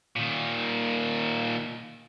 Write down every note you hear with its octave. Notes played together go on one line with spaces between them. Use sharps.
A#2 D#3